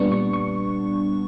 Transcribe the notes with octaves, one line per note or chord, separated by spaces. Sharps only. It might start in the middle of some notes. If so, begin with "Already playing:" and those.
Already playing: A#2 G3 B3 D4 C#6
C#6
C#6